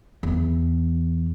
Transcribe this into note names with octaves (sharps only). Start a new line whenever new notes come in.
E2